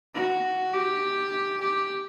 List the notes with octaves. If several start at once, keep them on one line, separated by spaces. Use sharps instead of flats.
F#4
G4
G4